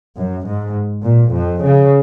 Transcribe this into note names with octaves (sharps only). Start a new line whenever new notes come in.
F#2
G#2
A#2
F2
C#3